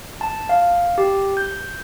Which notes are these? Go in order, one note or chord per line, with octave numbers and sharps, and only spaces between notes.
A5
F5
G4
G6